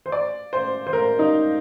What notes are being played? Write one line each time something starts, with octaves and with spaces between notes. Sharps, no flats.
C5
D5
C5
C5
A#4
D#4